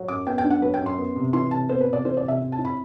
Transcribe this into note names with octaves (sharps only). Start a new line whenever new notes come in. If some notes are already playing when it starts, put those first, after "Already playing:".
Already playing: F#3
F#2 D6
B3 G5
G5
D4
F#5
F#3 B4
G5
F#2
C6
B3
C3
E3 C6
C3 A5
B3 C5
B4
C3
D5
E3 C5
D5
C3
E5
C4
A5
E4
B5